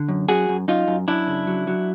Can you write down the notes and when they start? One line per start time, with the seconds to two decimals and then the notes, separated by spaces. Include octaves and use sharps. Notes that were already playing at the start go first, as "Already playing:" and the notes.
Already playing: D3
0.08 F#2
0.29 F#2 F#4 G#4
0.49 F#2
0.68 F#2 D#4 F4
0.88 F#2
1.08 F#2 D4 E4
1.27 C#3
1.47 F#3
1.67 F#3